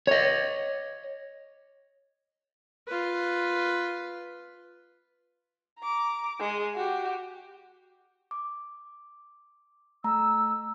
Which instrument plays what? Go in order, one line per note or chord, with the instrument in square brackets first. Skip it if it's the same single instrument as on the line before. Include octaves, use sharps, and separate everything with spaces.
[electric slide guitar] C#5 D#5
[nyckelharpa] F4 B4
[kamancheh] A#5 D6
G#3
F#4 G4
[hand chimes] D6
[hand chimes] A3 A#5 [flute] E6